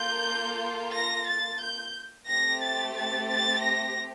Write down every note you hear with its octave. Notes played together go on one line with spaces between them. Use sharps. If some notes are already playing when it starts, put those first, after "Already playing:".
Already playing: A#3 F4 A4 G6
A#6
A6
G6
A3 C4 G4 A#6
A6
A6
A6
A#6